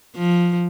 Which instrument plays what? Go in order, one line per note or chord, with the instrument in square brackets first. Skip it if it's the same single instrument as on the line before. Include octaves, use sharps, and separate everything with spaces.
[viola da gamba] F3